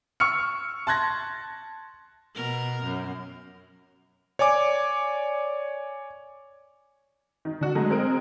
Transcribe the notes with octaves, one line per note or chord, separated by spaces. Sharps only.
C#6 E6 F6 C#7
A5 C6 F#6 G#6 A#6
B2 A#4
F#2
C#5 D5 G#5 D6
D#3
D3 D4 F#4
F#3 G#3 A3
G#3 C4 A#4 D7